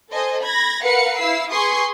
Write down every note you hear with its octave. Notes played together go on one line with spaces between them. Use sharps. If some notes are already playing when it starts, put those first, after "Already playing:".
A4 C5 D#5 G#5
B5 G#6 A#6
A#4 B4 F5 F#5 C#7
E4 F5 E6 C7
G#4 B4 G#5 C6 C#6 D#6